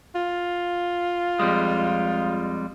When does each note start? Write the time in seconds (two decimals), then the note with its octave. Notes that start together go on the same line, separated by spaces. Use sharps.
0.15 F4
1.39 F2 G3 G#3